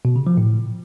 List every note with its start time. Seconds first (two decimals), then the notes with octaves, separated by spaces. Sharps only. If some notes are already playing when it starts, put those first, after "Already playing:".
0.05 B2
0.16 C#3
0.27 F3
0.38 A2